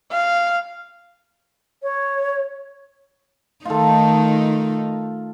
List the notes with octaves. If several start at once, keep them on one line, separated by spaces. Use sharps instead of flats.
F5
C#5
D#3 A3 D#4 F4 A4